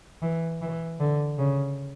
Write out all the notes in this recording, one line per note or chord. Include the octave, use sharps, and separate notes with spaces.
E3
E3
D3
C#3